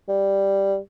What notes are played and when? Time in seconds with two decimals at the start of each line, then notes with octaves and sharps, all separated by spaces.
0.08 G3